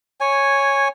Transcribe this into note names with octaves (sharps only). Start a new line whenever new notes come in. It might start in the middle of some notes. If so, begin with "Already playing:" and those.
C#5 G#5